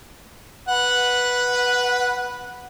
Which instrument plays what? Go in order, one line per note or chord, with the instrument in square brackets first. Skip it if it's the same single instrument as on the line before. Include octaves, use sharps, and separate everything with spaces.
[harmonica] B4 F#5